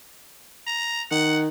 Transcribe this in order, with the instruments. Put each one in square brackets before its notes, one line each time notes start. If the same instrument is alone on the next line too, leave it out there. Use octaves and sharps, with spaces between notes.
[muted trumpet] A#5
[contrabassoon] D#3 [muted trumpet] F#5